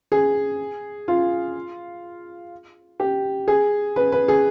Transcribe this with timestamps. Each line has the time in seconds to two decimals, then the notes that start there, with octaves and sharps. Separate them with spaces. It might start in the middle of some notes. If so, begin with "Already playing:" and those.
0.12 G#4
1.08 F4
3.00 G4
3.48 G#4
3.96 B4
4.12 B4
4.28 G#4